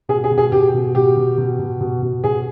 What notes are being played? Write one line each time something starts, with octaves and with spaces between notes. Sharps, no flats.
B2 G#4
G#4
B2
G#4
B2 G4
B2
B2 G4
B2
B2
B2
B2
B2
B2 G#4